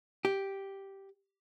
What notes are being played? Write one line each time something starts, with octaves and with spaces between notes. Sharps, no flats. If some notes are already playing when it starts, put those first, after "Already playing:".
G4